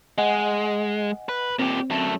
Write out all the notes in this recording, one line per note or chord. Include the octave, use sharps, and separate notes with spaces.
G#3 D#5 F#5 G#5
B4
A#2 C4 G4
F#2 A3